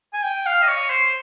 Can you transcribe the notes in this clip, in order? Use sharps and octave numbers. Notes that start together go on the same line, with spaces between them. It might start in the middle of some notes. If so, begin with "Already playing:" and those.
G#5
G5
F5
D#5
C#5
C5